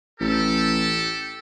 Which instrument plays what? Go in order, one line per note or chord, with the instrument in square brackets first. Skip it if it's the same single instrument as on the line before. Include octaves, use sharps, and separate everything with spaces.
[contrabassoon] A1 [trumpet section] G4 A4